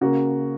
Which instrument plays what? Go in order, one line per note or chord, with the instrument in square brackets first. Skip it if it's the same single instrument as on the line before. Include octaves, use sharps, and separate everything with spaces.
[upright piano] C#3 A#3 F#4